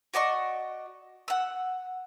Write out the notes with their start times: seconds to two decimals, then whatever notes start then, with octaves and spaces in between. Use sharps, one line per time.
0.14 F#4 D5 D#5 C#6
1.28 F#5 E6